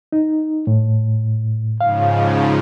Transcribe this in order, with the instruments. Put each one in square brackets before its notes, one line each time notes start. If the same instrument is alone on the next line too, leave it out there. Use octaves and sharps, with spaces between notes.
[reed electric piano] D#4
A2
[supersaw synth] G#2 C#3 F3 [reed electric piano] F5